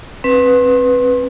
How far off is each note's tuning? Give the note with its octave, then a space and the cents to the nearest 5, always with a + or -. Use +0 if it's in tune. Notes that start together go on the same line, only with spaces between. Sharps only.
C4 +30 B4 +0